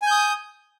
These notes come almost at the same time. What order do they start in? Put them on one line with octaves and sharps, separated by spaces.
G#5 G6 D#6